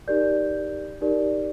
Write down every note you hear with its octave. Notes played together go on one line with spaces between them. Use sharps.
D#4 G4 A#4 D5 G6
D#4 G4 A#4 D5